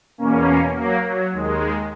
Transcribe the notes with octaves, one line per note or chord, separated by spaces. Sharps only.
E2 B2 A#3 C#4
F#3 A#3
F#3
D#2 D#3 G#3